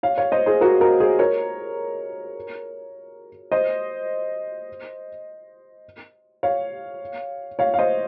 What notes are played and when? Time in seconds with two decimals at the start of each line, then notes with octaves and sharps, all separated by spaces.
0.03 C#5 F5
0.18 C#5 F5
0.32 C5 D#5
0.46 G#4 C5
0.61 F#4 A#4
0.81 F#4 A#4
1.00 G#4 C5
1.19 A#4 C#5
3.52 C5 D#5
6.43 C#5 F5
7.59 C#5 F5
7.74 F5
7.79 C5 D#5